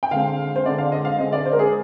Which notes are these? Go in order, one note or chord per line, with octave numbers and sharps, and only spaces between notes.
G5
D3 G#3 C4 F5
C5
D3 G#3 C4 D5
F5
D#5
F5
D3 G#3 C4 D#5
D5
C5
A#4
G#4